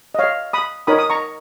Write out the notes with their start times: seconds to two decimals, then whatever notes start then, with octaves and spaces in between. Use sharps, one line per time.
0.15 D#5
0.19 C#5 F5
0.53 B5 D#6
0.87 D#4 A#4 C#5 B5 D#6
0.98 D#6
1.10 A#5 C#6